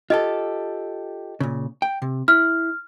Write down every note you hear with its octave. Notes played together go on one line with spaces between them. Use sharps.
F4 G4 A4 D#5
A#2 C#3
G5
C3
E4 F6